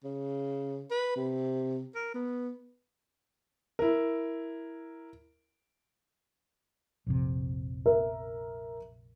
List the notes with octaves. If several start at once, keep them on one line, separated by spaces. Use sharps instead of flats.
C#3
B4
C3
A#4
B3
E4 A#4
A#1 F2 C3
A#4 E5